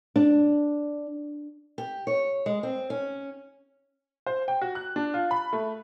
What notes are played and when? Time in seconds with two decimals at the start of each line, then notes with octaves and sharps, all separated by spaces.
0.16 D4
1.78 G4
2.07 C#5
2.46 G#3
2.63 C4
2.90 C#4
4.26 C5
4.48 G5
4.61 F#4
4.75 F#6
4.96 D4
5.14 F4
5.31 B5
5.53 A3